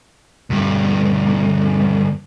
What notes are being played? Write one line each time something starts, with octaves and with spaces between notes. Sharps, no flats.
D2 G2